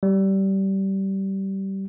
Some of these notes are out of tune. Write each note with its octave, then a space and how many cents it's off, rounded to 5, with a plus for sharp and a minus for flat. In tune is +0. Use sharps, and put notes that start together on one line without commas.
G3 -20